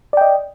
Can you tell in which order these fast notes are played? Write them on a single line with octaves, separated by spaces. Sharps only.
D5 G5 D#5